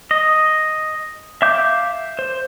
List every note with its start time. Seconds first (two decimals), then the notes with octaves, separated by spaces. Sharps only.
0.11 D#5
1.42 E5 F5 D6 G6
2.19 C5